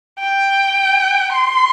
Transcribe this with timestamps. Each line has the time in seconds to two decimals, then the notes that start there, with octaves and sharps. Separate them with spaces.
0.20 G5
1.33 C6